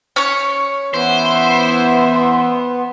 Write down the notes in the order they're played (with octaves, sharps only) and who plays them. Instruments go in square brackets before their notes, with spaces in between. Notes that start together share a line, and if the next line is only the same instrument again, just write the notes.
[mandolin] C#4 C#5
[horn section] E3 E5 [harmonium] B3 [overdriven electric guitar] C5